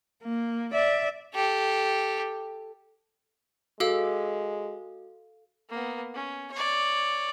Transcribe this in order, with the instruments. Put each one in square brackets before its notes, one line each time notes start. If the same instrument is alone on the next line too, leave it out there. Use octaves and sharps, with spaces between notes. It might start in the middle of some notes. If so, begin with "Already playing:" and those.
[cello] A#3
D5 E5
[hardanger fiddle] G4 A4
[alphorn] G#3 [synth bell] F#4 [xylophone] A4 F5 E6
[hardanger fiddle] A#3 B3
C#4
C#5 D5